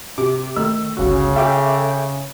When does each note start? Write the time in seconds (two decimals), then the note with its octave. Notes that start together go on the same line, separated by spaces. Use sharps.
0.18 C3 D6
0.56 D#3 A3 E6
0.97 G1 C#2 C#3 F#4
1.36 G#4 A4 E5 G5 D6